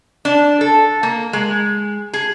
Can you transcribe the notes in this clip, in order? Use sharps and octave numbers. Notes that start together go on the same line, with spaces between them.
D4
A4
A#3
G#3
G#4